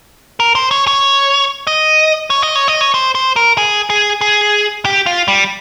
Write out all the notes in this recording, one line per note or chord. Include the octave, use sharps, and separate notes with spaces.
A#4
C5
C#5
C#5
D#5
C#5
D#5
C#5
D#5
C#5
C5
C5
A#4
G#4
G#4
G#4
G4
F4
G3